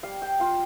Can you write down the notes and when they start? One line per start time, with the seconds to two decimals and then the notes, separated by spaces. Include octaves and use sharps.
0.03 G3 F5
0.22 G5
0.40 F4 F5